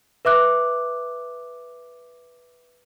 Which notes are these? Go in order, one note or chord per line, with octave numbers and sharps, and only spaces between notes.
B4 E5 D6 F#6